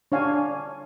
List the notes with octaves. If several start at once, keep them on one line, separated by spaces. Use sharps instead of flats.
D4 C#5 F5 G#5